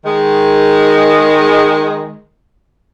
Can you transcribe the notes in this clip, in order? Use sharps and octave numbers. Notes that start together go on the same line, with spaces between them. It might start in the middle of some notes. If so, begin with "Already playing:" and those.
D#3 G#3